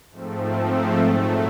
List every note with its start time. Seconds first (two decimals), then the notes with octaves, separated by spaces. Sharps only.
0.10 G#2 F3 A3 C4
1.00 A#2 F#3 A3